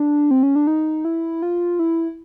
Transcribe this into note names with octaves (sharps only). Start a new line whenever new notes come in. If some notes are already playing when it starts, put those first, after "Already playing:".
Already playing: D4
C4
C#4
D4
D#4
E4
F4
E4